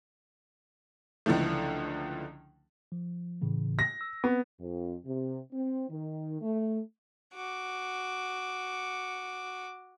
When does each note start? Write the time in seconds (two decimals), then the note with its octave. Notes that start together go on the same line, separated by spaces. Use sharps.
1.26 C#2 D3 E3 F3 A3
2.92 F3
3.42 A2 C#3 E3
3.79 A#6
4.01 E6
4.24 B3 C4
4.59 F2
5.05 C3
5.52 C4
5.89 D#3
6.41 A3
7.34 F#4 D6